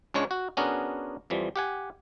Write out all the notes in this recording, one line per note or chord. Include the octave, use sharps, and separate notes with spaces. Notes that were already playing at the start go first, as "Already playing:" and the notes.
C#2 C#3 G#3 D4 C#5
F#4
B3 C#4 D4 F#4 G#4 A#4
F2 E3 F3 G3
G4 F#5 G#5